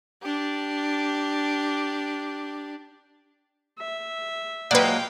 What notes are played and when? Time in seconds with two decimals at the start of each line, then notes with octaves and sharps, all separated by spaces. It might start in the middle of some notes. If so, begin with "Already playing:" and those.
0.23 D4 G4
3.79 E5
4.71 F3 F#3 G#3 A#3 B4 D5 F5 G5